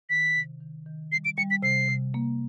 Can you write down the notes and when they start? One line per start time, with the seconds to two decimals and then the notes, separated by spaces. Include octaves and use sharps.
0.10 D#3 B6
0.36 C3
0.61 D#3
0.86 D#3
1.12 G3 C7
1.25 D7
1.38 G3 C#7
1.50 B6
1.63 C3 C7
1.89 C3
2.14 A#3